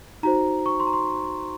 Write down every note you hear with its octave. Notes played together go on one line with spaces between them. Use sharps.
D#4 F#4 C5 A#5
C#6
C6
A#5
C6